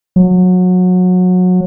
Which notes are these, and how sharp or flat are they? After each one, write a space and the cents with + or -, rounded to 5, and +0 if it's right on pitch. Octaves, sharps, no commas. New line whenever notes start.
F#3 -25